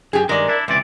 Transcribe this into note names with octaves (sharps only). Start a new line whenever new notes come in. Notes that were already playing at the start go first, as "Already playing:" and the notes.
F#2 G4 G#4
G2 D#3 G#3 A#4 D5
D4 E4
C#2 C3 E3 D5